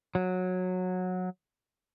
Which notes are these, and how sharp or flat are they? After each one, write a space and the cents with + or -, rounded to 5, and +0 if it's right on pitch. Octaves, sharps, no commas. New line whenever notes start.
F#3 -15